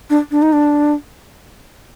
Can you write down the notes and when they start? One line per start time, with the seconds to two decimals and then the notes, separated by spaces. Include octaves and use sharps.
0.10 D4
0.31 D4
0.42 D#4
0.53 D4